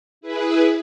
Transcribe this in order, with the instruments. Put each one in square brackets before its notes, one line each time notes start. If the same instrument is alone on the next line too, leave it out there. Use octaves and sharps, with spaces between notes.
[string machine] E4 G#4 B4